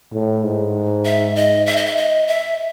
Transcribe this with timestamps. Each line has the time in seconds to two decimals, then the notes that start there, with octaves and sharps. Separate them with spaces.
0.13 A2
0.44 G#2
1.05 E5
1.36 D#5
1.66 E5
1.76 D#5
1.86 E5
1.97 D#5
2.28 E5